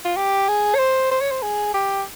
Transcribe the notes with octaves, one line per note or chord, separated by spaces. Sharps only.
F4
G4
G#4
C#5
C5
C5
C#5
C5
G#4
G4